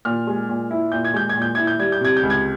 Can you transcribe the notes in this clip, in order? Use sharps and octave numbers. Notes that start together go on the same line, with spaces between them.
A#2 F6
G#3
A#2
E4
A#2 G6
G#6
G#3 G6
G#6
A#2
G6
E4 G#6
G6
G3 G#6
G6
C3 G#6
G6
C#2
G#6